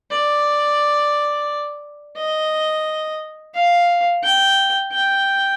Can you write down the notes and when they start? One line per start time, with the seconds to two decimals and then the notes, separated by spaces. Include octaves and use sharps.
0.11 D5
2.17 D#5
3.55 F5
4.23 G5
4.92 G5